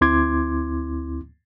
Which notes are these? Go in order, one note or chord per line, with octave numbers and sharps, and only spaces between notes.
D2 C4 E4 C6 D6 G#6